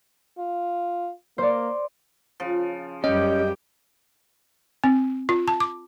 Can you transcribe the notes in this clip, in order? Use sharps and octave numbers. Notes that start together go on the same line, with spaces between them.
F4
A#3 C5 D5
C#3 F3
F#2 G3 C#4 G4 D#5 G5
C4
F4
A5
D6